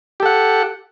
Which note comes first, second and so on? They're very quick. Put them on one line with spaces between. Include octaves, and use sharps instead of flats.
G4 A4 F#5